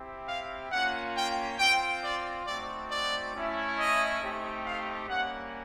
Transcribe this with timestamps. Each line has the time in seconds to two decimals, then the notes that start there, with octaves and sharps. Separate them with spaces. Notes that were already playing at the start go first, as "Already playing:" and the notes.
Already playing: C4 E4 G4
0.28 F5
0.71 A#3 C#4 F4 F#5
1.15 G5
1.59 C4 F4 G5
2.03 D5
2.46 A3 C4 D#4 F#4 D5
2.90 D5
3.34 A3 C#4 E4
3.78 D#5
4.21 A3 C4 D#4 G4
4.65 F5
5.09 G3 A#3 C#4 F#5